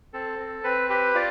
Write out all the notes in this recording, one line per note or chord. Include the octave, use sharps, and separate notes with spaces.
C4 A4
C4
C4 B4
G4 B4
F4 D5